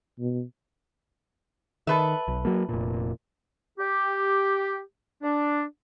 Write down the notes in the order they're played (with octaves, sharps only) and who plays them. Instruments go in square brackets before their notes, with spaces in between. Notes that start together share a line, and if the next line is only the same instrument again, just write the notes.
[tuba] B2
[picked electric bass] D#3 [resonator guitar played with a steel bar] A4 B4 E5
[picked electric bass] B1
F#3 A#3
F1 A#2
[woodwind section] G4
D4